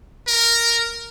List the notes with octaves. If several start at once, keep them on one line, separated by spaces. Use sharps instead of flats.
A#4